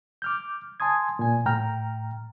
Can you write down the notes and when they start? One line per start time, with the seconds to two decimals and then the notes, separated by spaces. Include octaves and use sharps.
0.22 D6 F6 G6
0.80 G#5 A5 C6 D#6 G#6
1.19 A#2 G#5
1.46 A2 G5 A#5 F6